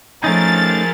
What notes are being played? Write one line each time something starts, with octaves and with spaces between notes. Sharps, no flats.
F3 A3 C#4 D#4 G#4 A#4 A6